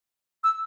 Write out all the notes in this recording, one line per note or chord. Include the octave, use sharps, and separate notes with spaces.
E6